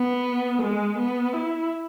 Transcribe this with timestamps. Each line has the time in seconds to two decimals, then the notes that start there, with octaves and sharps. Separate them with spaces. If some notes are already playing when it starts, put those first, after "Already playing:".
Already playing: B3
0.62 G#3
0.99 B3
1.34 E4